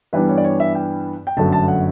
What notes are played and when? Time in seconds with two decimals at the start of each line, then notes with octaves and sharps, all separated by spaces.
0.13 G2 E3 G3 B3 D4 B4
0.29 C#5
0.38 D5
0.44 C#5
0.60 E5
0.75 G5
1.27 G5
1.37 G1 F#2 D3 F#3 A3 A5
1.53 A5
1.68 F#5